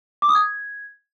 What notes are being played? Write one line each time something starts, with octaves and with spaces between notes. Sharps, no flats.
D6
D#6
G#6